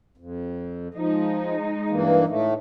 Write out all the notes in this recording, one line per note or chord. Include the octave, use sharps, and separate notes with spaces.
F2
F3 G#3 D#4
G2 E3 A#3
A2 A3